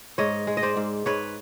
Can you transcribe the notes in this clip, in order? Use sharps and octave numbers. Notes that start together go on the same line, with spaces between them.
G#2 C#5 D#5
G#3
D#5
C5 D5
G#2
G#2 B4 C#5